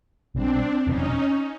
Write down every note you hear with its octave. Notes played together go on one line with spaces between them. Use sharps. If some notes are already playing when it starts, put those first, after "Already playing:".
B1 B2 G3 C4 D4
F1 E2 B2 F#3 C#4 D#4